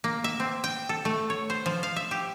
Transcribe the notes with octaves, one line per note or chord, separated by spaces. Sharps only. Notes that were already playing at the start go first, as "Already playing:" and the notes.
A#3
E5
C4
G5
A4
A3
C#5
C5
F3
F5
E5
G4